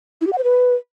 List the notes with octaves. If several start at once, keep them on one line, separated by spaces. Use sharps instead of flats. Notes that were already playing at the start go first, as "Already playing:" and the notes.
E4
G4
F#5
C5
B4